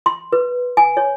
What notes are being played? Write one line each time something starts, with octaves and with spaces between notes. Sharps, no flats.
C6
B4
G#5
C#5